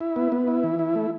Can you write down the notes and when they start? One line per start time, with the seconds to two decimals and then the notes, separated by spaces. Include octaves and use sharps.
0.01 E4
0.16 B3
0.32 B3
0.48 E4
0.64 E3
0.79 E4
0.95 A3